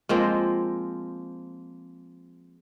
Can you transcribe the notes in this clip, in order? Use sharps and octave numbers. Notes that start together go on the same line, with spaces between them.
F3 G#3 A#3 C4